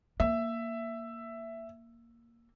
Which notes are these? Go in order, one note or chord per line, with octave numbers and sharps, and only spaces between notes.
A#3 E5